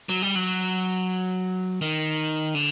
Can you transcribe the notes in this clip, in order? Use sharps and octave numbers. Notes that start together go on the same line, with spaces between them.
F#3
G3
F#3
D#3
D3